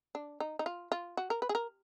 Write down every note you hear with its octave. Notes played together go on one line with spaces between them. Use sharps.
D4
D#4
D#4
F4
F4
F#4
A#4
B4
G#4
A#4